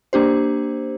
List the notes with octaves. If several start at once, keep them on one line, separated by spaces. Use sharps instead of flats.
A#3 D4 G4 C5